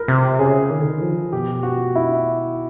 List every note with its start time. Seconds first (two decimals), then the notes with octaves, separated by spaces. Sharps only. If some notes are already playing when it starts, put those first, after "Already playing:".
Already playing: A#4 B4
0.08 C3
0.39 C#3 G#4
0.70 D#3
0.80 D3
0.88 D#3
1.01 F3
1.32 B2 G4
1.63 F#4
1.95 E4